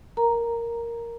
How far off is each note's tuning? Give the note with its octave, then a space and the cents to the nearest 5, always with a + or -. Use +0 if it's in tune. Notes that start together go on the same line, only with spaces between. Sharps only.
A#4 +0 A#5 +0